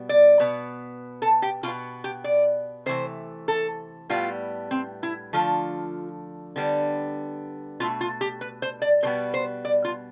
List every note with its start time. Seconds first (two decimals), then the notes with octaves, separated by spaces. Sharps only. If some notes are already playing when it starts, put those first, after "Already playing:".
Already playing: B2 G3 B3
0.09 D5
0.40 B2 B3
1.22 A4
1.42 G4
1.63 B2 F4
1.68 B3
2.04 G4
2.24 D5
2.86 C3 E3 A3 C5
3.48 A4
4.09 A2 G3 B3 F4
4.71 C4
5.03 E4
5.33 D3 F3 A3 F4
6.56 D3 G3 B3
7.80 B2 A3 F4
8.01 F4
8.21 G4
8.41 B4
8.62 C5
8.82 D5
9.03 B2 G3 B3 C5
9.34 C5
9.65 D5
9.85 F4